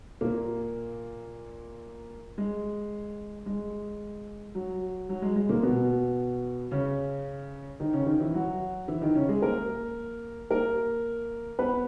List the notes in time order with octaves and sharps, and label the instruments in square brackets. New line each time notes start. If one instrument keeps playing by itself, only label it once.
[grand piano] A#2 A#3
G#3
G#3
F#3
F#3
G#3
G#3
A#2 A#3
B2 B3
C#3 C#4
D#3 D#4
C#3 C#4
D#3 D#4
E3 E4
F#3 F#4
E3 E4
D#3 D#4
C#3 C#4
G#3 G#4
A#3 A#4
A#3 A#4
B3 B4